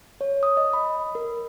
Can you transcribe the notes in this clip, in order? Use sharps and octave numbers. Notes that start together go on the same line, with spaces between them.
C#5
D#6
D#5
B5
A#4